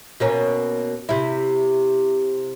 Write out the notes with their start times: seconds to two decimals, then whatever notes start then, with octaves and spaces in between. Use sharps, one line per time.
0.20 B2 A#3 C#4
1.09 C3 E4